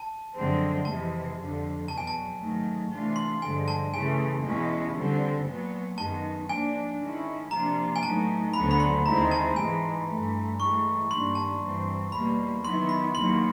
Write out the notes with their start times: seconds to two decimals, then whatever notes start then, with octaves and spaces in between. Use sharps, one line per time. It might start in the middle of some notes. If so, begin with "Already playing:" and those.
Already playing: A5
0.34 F#2 D3 F3 G#3 C4
0.85 F2 C3 E3 G#3 A5
1.37 F2 D3 F3
1.88 E2 B2 F#3 A5
1.98 G#5
2.07 A5
2.39 G#2 D#3 F#3 A3
2.91 C3 E3 A3 D4 F4
3.16 C6
3.42 G2 D3 F3 G#3 G#5
3.68 A5
3.93 C#3 E3 A3 G#5
4.45 E2 B2 G#3 C#4 E4
4.95 D3 G3 C4
5.46 A#2 F#3 B3
5.98 F#2 D#3 G#3 B3 A5
6.49 G#2 F3 A#3 D4 G#5
7.00 D#3 G#3 C#4 E4
7.51 C3 F3 A#3 D4 F4 A#5
7.96 G#5
8.03 A2 F#3 B3 D#4 A5
8.54 D2 D3 F#3 B3 B5
8.71 B5
8.80 C6
9.05 D#2 D#3 G#3 C4 E4 A#5
9.31 A5
9.56 G#2 E3 G#3 G#5
10.08 G2 E3 A3
10.59 A2 E3 G#3 C#6
11.10 G2 D#3 G3 A#3 D4 C6
11.35 A5
11.61 G2 E3 G3 C4
12.12 E2 B2 G3 A#3 B5
12.64 D#3 F#3 B3 E4 C6
12.89 B5
13.15 D#2 D#3 F#3 A#3 C6